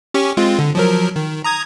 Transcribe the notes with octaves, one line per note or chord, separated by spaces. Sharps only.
C#4 G4 C#6
G#3 C4 F4
D3
F3 F#3 A#4
D#3
A#5 D#6 G#6